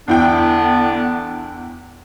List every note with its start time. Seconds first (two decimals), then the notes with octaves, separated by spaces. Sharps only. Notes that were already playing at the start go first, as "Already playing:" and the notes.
0.08 E2 D3 B3 D4 E4 G5